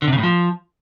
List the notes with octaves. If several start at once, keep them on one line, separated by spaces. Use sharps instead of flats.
D3
C3
C#3
A2
F3